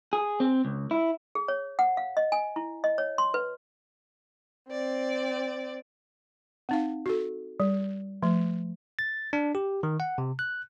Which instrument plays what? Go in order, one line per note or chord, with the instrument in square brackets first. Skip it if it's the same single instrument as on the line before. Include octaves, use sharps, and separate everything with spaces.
[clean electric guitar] G#4
C4
C#2
E4
[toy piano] G#4
C#5
F#5
F5
D#5
G#5
E4
D#5
C#5
C6
B4
[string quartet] C4 D5
[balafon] C4 D#4 F5
F#4 A4
G3
F3 A3
[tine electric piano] A6
D4
G4
D#3
F#5
C3
F#6